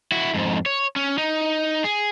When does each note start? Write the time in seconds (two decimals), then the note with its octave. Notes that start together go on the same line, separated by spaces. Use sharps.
0.12 E4 F#4
0.34 F2 G#2
0.66 C#5
0.96 C#4
1.18 D#4
1.84 G#4